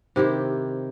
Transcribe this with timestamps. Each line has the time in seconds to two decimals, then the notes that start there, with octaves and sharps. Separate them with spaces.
0.16 C3 D#3 E4 G4